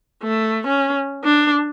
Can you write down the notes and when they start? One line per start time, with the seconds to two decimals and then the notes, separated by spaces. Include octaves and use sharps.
0.23 A3
0.67 C#4
1.24 D4